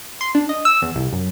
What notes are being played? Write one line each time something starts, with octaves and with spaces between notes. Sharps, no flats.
C6
D4
D#5
E6
E2
C2
F#2